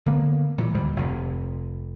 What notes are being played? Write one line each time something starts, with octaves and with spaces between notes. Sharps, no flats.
D3 A#3 B3
A#2 E3 F#3 G3
D2 G#2 D#3 G3
F1 F2 C3